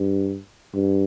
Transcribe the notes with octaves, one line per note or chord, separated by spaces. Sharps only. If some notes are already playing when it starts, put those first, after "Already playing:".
Already playing: G2
G2